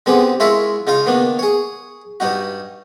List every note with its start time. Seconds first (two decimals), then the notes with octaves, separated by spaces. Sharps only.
0.06 D3 B3 C4 G4 G#4
0.40 G#3 E4 F4 A#4 C#5 E5
0.87 C#3 D#4 F4 F5
1.06 D#3 A#3 B3 D4
1.39 G#4 C#5
2.20 G2 G3 D#4 F#4